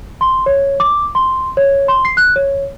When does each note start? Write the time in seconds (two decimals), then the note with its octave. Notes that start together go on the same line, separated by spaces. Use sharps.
0.21 C6
0.46 C#5
0.80 D6
1.15 C6
1.57 C#5
1.88 C6
2.05 C7
2.17 F#6
2.36 C#5